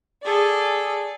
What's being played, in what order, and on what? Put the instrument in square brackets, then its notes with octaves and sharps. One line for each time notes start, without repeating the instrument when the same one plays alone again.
[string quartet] G#4 A4 D5